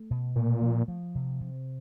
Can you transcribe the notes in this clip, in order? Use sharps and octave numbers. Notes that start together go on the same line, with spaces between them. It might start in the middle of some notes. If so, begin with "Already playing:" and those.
Already playing: A3
B2
A#2 A3
F3
F3
C3
C3